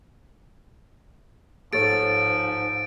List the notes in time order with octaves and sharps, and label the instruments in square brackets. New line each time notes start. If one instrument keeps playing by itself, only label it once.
[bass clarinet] G#2 [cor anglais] F3 [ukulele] A4 C#5 [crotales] A6 D7